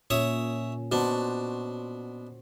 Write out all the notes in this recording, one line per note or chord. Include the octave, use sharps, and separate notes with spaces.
A#2 C#4 C#5 E5 D#6
B2 D4 F#4 C5